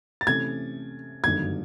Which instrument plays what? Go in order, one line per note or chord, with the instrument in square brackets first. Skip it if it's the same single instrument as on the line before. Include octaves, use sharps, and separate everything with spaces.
[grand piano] A6
[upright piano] C3 E3 A3 C#4 [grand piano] G#6
[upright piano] G1 F#2 D#3 F#3 A3 [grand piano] G#6